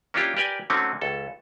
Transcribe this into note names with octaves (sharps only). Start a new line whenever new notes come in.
A#3 C#4 D4 E4 F4 G4
G4 A#4 B4 D5 G5 G#5
D3 F#3 A3 C4 C#4 D#4
C#2 A4